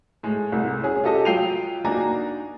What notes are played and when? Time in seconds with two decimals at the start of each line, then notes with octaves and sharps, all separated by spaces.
0.23 A2 G#3
0.52 C2 A2
0.83 C#4 G#4
1.04 F4 G4 A4 D#5 A5
1.25 F#3 F4 G5 C7 D#7 F7
1.85 A#3 D4 D#4 F#4 G#5 A#5